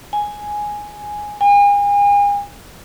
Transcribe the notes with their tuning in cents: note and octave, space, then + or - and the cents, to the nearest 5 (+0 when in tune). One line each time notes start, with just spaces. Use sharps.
G#5 +0
G#5 -40